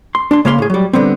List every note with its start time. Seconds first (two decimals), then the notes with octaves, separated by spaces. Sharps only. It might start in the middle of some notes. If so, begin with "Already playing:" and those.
0.15 C6
0.31 D4 C6
0.45 C#3 G#3 A#3 F5 B5 C6
0.58 A2 G#4
0.70 F#3 G3
0.93 D3 G3 B3 C4